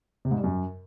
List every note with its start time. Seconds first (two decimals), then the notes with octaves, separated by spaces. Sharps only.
0.25 C3
0.31 G#2
0.38 G3
0.44 F#2